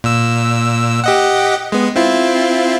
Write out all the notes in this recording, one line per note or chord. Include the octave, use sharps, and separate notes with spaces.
A#2 E6
G4 D#5 F#5
G#3 B3
C4 E4 F4